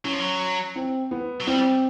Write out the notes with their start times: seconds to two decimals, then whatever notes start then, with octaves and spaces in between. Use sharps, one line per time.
0.05 F#3 C#4
0.13 F3
0.20 F#3
0.76 C4
1.11 B3
1.41 F#3
1.47 G3 C4